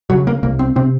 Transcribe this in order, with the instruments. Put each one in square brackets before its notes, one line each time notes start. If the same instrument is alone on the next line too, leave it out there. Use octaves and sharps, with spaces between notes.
[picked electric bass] C#3 F#3
A#3
C2 A#3
C4
C3 C4